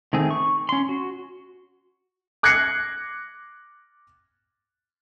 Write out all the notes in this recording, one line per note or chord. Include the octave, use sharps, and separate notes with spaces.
D#3 A3 C4 G#4
C#6
C#4 C6
F#4
D6 F#6 G#6 A#6 C7 C#7